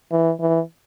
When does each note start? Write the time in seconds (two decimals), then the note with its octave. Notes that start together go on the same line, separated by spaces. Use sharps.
0.12 E3
0.40 E3